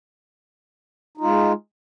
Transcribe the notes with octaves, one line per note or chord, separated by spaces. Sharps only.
G#3 D#4 F4